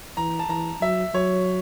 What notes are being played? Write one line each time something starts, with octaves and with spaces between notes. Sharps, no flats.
E3 A#5
A5
E3 A#5
F#3 E5
F#3 C#5